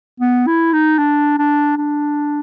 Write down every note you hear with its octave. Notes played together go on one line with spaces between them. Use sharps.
B3
E4
D#4
D4
D4
D4